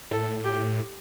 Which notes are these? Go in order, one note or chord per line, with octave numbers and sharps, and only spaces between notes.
A2 A4
G4